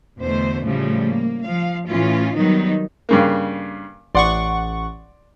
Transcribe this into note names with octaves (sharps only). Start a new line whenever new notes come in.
E2 B2 D3 A3 C5
A2 C#3 F3 G3 A3
A#3
F3 F5
A2 E3 C#4 F4
D#3 F#3 G3 B3 D#4
G2 C#3 A#3
A1 D5 F#5 C6 C#6